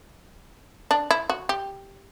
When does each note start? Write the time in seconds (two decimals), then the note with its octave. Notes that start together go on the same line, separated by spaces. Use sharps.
0.91 D4
1.11 E4
1.30 F#4
1.49 G4